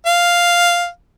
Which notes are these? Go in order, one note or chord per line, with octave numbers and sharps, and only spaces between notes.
F5